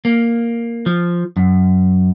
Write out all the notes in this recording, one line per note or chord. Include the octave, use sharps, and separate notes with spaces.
A#3
F3
F#2